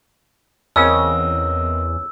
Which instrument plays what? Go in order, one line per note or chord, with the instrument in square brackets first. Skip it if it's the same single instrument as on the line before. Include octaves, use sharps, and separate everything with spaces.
[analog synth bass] E2 [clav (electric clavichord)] C#3 C#4 [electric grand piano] C4 A#4 D#5 [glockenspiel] E6